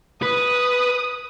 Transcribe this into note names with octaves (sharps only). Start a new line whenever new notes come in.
B4 D#6